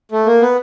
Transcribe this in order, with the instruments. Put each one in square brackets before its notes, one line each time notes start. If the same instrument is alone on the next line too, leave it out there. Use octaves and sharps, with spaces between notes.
[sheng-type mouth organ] A3
A#3
B3